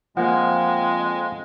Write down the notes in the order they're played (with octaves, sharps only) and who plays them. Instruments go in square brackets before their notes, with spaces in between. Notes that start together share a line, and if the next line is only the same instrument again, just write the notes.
[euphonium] F2 [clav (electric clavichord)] F3 A#3 [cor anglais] G#3 [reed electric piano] F#5